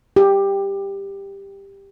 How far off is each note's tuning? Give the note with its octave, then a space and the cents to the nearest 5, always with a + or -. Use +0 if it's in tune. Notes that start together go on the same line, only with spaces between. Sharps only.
G4 +10